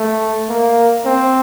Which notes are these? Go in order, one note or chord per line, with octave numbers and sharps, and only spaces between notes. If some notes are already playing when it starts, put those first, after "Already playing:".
Already playing: A3
A#3
C4